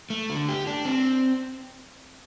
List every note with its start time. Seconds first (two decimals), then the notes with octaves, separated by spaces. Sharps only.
0.10 A3
0.29 D3
0.48 G4
0.67 D4
0.85 C4